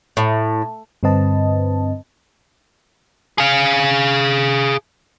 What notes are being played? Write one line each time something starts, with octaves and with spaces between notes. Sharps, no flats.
A2
G2 D3 C4 B4 D#5 A5
G#4 F5